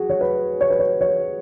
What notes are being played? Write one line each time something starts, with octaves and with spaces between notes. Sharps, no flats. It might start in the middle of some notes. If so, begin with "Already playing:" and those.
Already playing: F#4 G#4
C#5
B4
C#5
B4
C#5
C#5